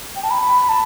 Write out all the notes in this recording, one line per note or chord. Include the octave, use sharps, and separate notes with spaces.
G5
A5
B5
A5